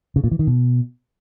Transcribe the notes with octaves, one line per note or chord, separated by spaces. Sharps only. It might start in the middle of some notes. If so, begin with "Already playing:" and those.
C#3
A#2
E3
D#3
B2